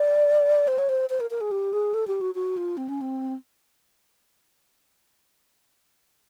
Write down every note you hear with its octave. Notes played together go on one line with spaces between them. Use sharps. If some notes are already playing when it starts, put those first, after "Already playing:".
Already playing: D5
C5
C#5
C5
C5
A#4
A#4
G#4
G4
G#4
A4
G4
F#4
F#4
F4
C4
C#4
C4